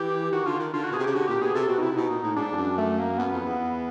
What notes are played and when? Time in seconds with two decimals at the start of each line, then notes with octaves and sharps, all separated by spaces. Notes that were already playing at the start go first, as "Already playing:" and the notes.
Already playing: E3 G4
0.32 D#3 F#4
0.46 D3 F4
0.59 D#3
0.73 D3 F4
0.84 F#4
0.91 B2 G#4
0.99 C3
1.04 C#3 G4
1.14 D3 F#4
1.28 A#2 G4
1.41 B2 G#4
1.55 C3 A4
1.69 B2 F#4
1.78 D#4
1.82 C3 E4
1.96 B2 D#4
2.10 A#2
2.23 A2
2.36 G#2 D4
2.52 F2
2.57 F#2
2.78 A3
2.99 A#3
3.18 F#2 B3
3.32 F2
3.46 E2